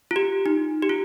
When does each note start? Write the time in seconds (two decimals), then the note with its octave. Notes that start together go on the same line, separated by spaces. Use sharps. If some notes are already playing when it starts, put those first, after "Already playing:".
0.11 F4
0.16 G4
0.46 D#4
0.82 G4
0.89 F4